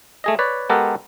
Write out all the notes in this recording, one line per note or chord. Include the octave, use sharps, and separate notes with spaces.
A3 G#4 D#5
B4 C#5 D5
G#3 B3 G4 A4 A#4 F#5